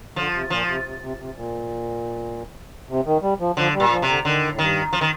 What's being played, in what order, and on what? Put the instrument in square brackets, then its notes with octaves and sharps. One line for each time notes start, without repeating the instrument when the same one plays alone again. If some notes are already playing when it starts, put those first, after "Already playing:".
[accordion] D3 [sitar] F3
[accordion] C3
[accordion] A#2 [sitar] F3
[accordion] C3
C3
C3
C3
A#2
C3
D#3
G3
F3
[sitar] D3 [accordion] F3
[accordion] G3
[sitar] A#2
[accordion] F3
[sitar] C3
[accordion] D3
[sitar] D3 [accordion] D#3
[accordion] A2
[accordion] G2 [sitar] D#3
[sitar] F3
D#3